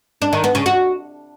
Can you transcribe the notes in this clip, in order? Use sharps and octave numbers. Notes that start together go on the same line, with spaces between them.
D4
D#3
B3
C#3
F#4